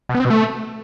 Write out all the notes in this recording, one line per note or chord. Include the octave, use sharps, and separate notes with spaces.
B2
B3
C4
B2
A3